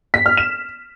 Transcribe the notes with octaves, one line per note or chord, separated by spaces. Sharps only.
B6
F6
E7